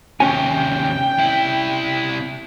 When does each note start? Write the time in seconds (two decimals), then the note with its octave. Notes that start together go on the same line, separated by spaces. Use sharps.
0.20 D#2 C3 C#4 G5 G#5
1.19 C3 E4